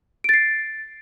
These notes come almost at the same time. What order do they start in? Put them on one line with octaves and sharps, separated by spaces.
D7 A6 C7